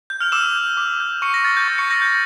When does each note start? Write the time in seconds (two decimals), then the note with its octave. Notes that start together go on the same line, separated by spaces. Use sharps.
0.10 G6
0.21 F6 F7
0.32 D6 E6 E7
0.55 G6
0.77 D6
1.00 G6
1.22 C#6 C#7
1.34 A#6
1.44 F6 A6
1.57 G6
1.67 C#6 A6
1.78 C#6 C#7
1.90 E6 G6 A#6
2.02 G6